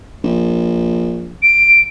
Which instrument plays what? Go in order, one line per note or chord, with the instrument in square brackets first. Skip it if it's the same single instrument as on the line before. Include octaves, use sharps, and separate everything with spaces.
[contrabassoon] A#1
[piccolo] D7